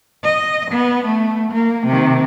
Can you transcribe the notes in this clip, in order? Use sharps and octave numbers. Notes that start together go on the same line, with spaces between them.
D#5
B3
A3
A#3
C3 D#3